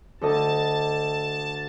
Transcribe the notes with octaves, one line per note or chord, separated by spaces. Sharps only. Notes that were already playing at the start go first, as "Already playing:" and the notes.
D2 A4 D#5 A5